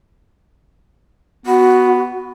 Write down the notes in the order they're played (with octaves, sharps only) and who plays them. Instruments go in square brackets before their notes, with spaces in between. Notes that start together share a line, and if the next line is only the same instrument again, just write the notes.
[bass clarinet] B3 [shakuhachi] F#4